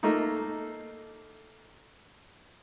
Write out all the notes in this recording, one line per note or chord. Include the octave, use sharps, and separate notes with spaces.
A3 A#3 D#4